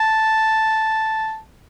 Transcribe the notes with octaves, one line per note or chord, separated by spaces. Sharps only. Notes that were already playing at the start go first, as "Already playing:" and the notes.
Already playing: A5